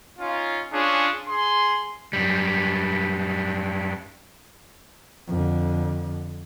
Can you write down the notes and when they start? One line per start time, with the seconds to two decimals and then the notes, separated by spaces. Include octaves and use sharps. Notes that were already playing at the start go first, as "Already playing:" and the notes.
0.19 C#4 D#4 F4
0.73 C#4 D4 F4 G#4 C#5
1.28 G#4 C6
2.13 F#2 G3
5.28 F2 D3